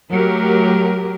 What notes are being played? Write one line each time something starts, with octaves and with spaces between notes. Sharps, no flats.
F#3 A3 G4 A#4